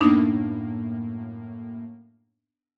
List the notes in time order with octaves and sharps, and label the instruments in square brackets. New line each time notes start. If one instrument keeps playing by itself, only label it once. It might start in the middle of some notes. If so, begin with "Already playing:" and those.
[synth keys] F#2 A2 A#3 [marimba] B3 D4 D#4